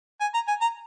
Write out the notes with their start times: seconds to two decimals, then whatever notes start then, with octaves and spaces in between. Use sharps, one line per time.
0.21 G#5
0.34 A#5
0.48 G#5
0.61 A#5